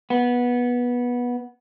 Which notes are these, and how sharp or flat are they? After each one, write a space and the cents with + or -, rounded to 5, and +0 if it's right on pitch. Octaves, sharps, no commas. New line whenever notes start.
B3 -15